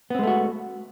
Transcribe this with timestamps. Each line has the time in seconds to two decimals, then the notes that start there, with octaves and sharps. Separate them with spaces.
0.10 B3
0.15 C4
0.19 G#3
0.23 A3
0.27 F#4